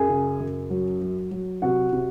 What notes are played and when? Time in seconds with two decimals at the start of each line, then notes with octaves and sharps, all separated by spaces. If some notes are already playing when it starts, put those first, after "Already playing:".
Already playing: F#2 G#4 G#5
0.09 C#3
0.40 F#2
0.70 F#3
1.01 F#3
1.31 F#3
1.62 C3 F#4 F#5
1.93 C3